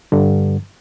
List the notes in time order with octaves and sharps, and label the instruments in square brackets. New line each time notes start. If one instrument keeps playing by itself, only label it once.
[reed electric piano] G2 D3